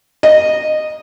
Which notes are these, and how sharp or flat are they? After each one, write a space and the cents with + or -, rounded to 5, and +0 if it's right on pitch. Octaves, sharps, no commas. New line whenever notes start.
D#5 -15